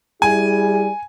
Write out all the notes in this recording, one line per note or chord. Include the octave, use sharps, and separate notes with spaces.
G3 E4 G#4 G#5